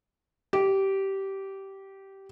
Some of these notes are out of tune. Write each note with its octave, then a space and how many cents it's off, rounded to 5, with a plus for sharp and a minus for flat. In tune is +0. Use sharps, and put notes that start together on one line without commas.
G4 -15